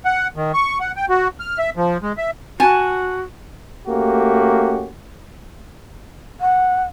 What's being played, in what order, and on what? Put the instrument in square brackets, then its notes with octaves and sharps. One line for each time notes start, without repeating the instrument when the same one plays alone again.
[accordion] F#5
D#3
C#6
F#5
G5
F#4
F6
E5
F3
G#3
E5
[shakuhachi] F#4 [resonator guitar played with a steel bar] G#5 A5
[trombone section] A3 A#3 C#4 F#4 G4
[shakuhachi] F#5